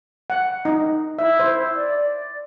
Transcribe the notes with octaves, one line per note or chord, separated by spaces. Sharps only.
F#5
D#4
E4 E5
C5
D5
D5